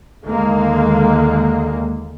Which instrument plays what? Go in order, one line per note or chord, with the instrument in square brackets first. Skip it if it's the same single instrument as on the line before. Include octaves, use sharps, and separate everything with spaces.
[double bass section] D#2 D3 G#3 A#3